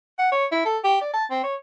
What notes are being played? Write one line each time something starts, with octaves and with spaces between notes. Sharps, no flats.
F#5
C#5
E4
A4
G4
D5
A5
C4
C#5